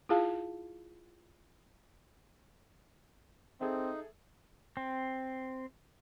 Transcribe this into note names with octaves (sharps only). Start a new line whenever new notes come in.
E4 F4 G#4 F5 A5
C4 D#4 G#4 A4 E5
C4